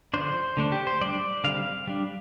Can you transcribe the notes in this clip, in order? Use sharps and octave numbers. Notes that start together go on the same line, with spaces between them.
D3 F3 D4 C5
D3 A3 D4
G4
C5
G3 D4 D5
D3 G3 C4 F5
G3 D4